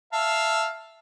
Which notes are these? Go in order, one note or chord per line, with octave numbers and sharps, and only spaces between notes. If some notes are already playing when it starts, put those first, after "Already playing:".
E5 F5 A5